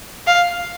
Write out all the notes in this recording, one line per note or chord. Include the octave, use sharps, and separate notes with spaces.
F5